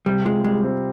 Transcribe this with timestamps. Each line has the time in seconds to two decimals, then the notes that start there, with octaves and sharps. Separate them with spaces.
0.06 C3 G3
0.25 G#3 F4
0.44 G3 G#3
0.64 C4